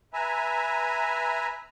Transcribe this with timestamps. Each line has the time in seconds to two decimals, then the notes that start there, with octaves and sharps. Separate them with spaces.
0.13 B4 E5 G#5 A#5